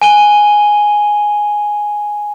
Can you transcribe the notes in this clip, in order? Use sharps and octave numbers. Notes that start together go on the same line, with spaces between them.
G#5 D#7 G7